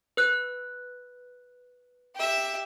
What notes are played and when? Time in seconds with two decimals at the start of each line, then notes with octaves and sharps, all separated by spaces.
0.17 B4 F#6
2.15 G4 E5